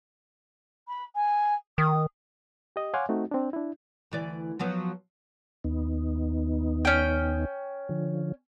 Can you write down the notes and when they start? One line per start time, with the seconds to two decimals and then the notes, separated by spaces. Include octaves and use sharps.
0.87 B5
1.15 G#5
1.78 D#3 D#6
2.76 G4 D#5
2.94 C#5 F5 F#5 G#5 C6 D6
3.09 A3 C4 D#4 F#4
3.31 C4 D4
3.53 D4 E4
4.11 D2 E3 D5
4.59 F3 F#3 B3
5.64 D#2 B3 D#4
6.85 C#4 G5
7.89 D3 F3